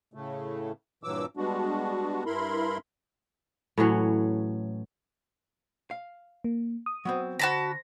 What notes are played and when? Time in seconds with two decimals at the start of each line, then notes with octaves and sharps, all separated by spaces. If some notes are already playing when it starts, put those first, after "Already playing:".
0.14 A2 C#3 A3
1.04 G2 A#2 E3 F#3 D6 E6
1.37 G3 G#3 B3 D4 F#4
2.26 G2 E4 A#4 B5 C6
3.77 A2 E3 F#3 C#4
5.91 F5
6.44 A#3
6.86 D#6
7.05 F#3 B3 C4
7.39 D3 F#4 C5 A5 B5 A#6